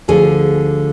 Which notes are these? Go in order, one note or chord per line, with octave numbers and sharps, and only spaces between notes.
D2 D3 F3 G#4